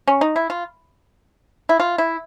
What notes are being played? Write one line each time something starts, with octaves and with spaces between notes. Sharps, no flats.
C#4
D#4
E4
F4
E4
F4
E4